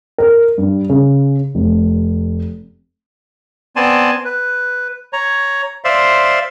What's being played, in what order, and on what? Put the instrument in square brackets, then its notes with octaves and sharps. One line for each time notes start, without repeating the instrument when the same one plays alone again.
[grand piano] A#4
G2
C#3
F1
[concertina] B3 C4 D5 G#5 A5 C6
B4
C#5 A#5
C5 D5 E5 F5 C6